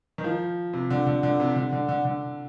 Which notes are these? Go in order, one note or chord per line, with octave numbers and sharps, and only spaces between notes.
D#3
F3
C3
D3
D3
D3
C3
D3
D3
D3
D3